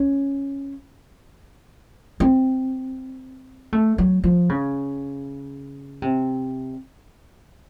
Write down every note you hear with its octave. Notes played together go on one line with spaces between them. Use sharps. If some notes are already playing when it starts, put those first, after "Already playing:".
Already playing: C#4
C4
A3
F#3
F3
C#3
C3